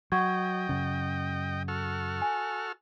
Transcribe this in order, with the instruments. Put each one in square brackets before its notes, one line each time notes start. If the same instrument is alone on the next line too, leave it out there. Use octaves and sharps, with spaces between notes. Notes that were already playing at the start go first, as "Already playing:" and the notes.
[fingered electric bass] F#3 [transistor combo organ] D#5 G5 [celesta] F#5 C#6 G#6
[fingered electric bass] F#2 C#3
[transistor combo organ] F#4 A4 F6
[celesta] G#5